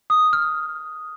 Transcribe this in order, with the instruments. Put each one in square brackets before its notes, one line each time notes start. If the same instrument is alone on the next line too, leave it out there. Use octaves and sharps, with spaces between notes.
[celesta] D#6
F6